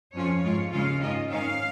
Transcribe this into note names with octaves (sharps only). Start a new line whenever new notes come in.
F2 F3 C#4 F4 C#5
G#2 G#3 F4
D#2 C#3 G#3 C#4 F4 F5
G#2 D#3 C#4 F4 D#5
G#2 D#3 C#4 F5